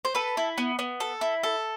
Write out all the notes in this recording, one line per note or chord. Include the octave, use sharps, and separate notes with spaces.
C5
A4 B4
E4
B3
B3
A4
E4
A4